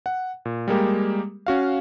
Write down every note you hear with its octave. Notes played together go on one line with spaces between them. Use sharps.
F#5
A#2
G3 G#3 A#3 G4
C#4 F#4 F5